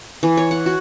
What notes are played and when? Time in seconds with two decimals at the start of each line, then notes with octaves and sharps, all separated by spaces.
0.23 E3
0.37 C#5
0.51 F#5
0.66 F#4